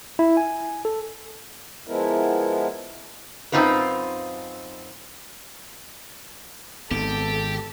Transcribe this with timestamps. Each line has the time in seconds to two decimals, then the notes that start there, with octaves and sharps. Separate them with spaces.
0.19 E4
0.37 G#5
0.85 A4
1.88 F3 G#3 B3 E4 A#4
3.52 F#2 A#2 C4 D#4 F4 B4
6.91 G#1 D#3 B3 G4 A4